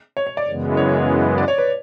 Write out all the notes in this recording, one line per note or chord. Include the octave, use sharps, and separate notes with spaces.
C#5
C#5
D5
F#2 C#3 E3 G#3 B3
C#5
D5
C#5
B4